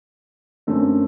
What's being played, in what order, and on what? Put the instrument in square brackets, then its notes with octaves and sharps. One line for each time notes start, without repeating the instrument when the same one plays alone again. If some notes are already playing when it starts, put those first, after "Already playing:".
[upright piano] F#2 D3 A3 C4